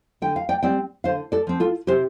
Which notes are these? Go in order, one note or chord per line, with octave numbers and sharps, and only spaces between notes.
D3 G5
F5
D5 G5
G3 C4 D5 G5
D3 C5 F5
A4 D5
F3 C4
F4 A4
C3 G4 C5